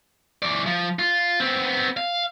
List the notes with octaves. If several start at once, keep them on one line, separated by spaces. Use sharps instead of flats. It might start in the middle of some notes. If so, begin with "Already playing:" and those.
E3 D5
F3
F4
B3 C4
F5